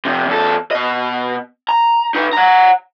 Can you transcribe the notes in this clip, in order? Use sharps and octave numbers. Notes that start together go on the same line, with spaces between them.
F2 C3
E2 A4
B2 D#5
A#5
D#4 B4
F#5 A#5